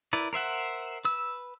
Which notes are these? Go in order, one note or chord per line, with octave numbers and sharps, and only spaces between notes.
E4 A#4 B4 D5
A#4 C5 E5 F#5
B4 E6